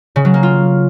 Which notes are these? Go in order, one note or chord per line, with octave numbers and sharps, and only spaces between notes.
C#3
F#3
A#3
F4